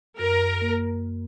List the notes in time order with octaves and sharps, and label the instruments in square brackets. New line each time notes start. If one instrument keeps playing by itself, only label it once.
[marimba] F#2 [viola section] A#4
[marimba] A#3